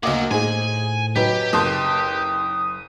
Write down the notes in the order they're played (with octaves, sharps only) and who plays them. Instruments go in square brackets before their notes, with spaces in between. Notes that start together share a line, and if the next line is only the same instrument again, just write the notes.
[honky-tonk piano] D2 D#5 D6 [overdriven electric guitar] F#3 [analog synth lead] A#3
[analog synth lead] A2 [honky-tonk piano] D#4 G#4 [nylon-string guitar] C5 [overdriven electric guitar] G#5
[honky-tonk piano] F#3 B6 [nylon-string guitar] D#4 B4 [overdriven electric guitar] G4
[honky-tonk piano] F#1 A5 C6 [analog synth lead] D#6